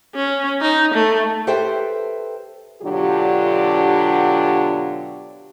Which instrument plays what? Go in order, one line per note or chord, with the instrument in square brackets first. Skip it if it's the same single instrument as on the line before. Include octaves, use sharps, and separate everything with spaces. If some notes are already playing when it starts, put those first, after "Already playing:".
[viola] C#4
D#4
A3
[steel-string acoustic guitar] G4 A4 B4 C5 E5 G5
[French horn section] B2 D3 F#3 D4 F4 G4